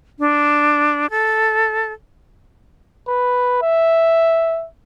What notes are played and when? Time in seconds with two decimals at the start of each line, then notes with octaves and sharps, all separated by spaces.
0.19 D4
1.10 A4
3.08 B4
3.62 E5